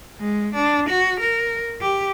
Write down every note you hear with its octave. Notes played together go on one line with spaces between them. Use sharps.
G#3
D4
F#4
A#4
G4